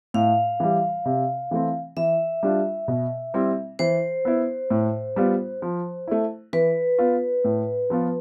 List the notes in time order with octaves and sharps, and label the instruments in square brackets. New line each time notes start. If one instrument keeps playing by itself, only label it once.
[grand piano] A2 [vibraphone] F5
[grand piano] E3 G3
C3
E3 A3 C4
[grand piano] E3 [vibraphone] E5
[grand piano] G3 D4 F4
B2
G3 C4 E4
[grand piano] E3 [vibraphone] C5
[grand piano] B3 E4
A2
G3 B3 F4
F3
A3 E4
[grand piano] E3 [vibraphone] B4
[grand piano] B3 F4
A2
F3 B3 F4